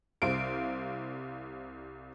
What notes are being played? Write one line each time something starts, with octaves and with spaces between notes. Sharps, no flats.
C2 C5 F5 D7